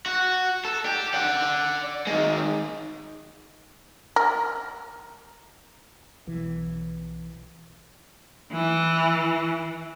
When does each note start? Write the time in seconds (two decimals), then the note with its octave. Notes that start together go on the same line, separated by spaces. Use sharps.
0.06 F#4
0.65 A4
0.86 G4
1.14 D5 F#5
2.07 D#3 G#3
4.16 A#4
6.27 B1 E3
8.53 E3